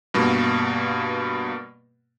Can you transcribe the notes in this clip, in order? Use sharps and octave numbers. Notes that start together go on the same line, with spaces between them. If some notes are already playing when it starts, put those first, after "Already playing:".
G2 B2 A#3